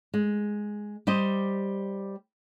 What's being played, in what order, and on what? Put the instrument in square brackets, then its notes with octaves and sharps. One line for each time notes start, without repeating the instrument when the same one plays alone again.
[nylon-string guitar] G#3
G3 G4 C5 D#5